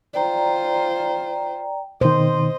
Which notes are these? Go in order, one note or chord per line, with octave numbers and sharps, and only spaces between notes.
F4 C5 D5 G5 A#5
B2 D#3 C5 D#5